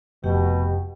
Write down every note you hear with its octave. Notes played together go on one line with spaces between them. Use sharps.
F1 B2 G4 G5